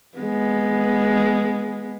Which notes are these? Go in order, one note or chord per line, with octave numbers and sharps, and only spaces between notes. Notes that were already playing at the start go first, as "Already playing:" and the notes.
G#3 B3